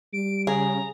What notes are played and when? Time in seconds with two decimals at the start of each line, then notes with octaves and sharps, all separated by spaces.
0.13 G3 D7
0.47 C#3 G#4 A#5